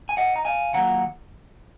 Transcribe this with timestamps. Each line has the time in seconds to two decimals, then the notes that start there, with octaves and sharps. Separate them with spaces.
0.09 G#5
0.17 D#5 F#5
0.36 A#5
0.45 F5 G#5
0.73 C2 C3 D#3 F#3 A#3 F#5 A#5